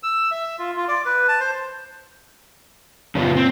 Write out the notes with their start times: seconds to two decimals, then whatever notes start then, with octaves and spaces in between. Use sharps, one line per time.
0.03 E6
0.31 E5
0.59 F4
0.77 F4
0.88 D5
1.05 B4
1.28 A5
1.40 C5
3.15 F#1 A#2 C#3 B3 F4
3.37 C4